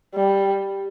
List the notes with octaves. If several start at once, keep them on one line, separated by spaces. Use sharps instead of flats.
G3